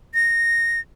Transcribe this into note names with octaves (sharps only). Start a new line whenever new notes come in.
A#6